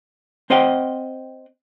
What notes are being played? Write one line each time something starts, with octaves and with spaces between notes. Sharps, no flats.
C4 C5 D#5 F#5 G5